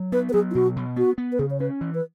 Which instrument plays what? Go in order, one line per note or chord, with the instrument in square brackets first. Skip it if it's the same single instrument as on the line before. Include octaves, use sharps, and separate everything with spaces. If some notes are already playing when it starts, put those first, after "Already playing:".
Already playing: [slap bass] F#3
[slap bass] B3 [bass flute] B4
[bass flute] B4
[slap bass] F#3 [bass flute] G#4
[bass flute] E4
[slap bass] B2 [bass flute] F#4
[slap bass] B2
[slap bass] B3 [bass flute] F#4
[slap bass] B3
[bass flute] B4
[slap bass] C#3 [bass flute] G#4
[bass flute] C#5
[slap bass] C#4 [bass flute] B4
[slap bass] E3
[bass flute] B4